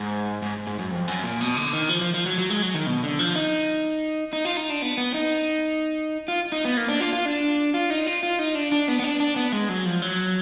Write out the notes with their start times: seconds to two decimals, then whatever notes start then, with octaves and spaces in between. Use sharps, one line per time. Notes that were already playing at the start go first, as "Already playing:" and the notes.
Already playing: G#2
0.42 G#2
0.67 G#2
0.79 F#2
0.91 F2
1.08 F#2
1.24 A#2
1.41 B2
1.57 D3
1.73 D#3
1.89 F3
2.01 F3
2.14 F3
2.26 F#3
2.38 F#3
2.50 G#3
2.62 F#3
2.74 D#3
2.86 B2
3.03 D3
3.19 F3
3.36 D#4
4.33 D#4
4.45 F4
4.57 D#4
4.70 D4
4.82 B3
4.97 B3
5.14 D#4
6.28 F4
6.52 D#4
6.65 B3
6.77 A#3
6.88 D4
7.00 F4
7.13 F4
7.25 D4
7.74 F4
7.90 D#4
8.07 F4
8.23 F4
8.39 D#4
8.55 D4
8.72 D4
8.88 B3
8.99 B3
9.04 D4
9.20 D4
9.36 B3
9.52 G#3
9.69 F#3
9.85 F3
10.02 F#3